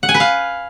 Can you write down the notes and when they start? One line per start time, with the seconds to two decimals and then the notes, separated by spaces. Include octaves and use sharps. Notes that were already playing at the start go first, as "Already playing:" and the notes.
0.03 F#5
0.09 G#5
0.14 B4
0.20 F5